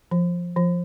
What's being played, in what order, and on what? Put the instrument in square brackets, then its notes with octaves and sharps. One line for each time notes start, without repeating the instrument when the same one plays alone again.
[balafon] F3
F3